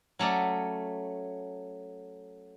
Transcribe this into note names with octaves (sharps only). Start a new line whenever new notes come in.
F#3 A3 C#4 D5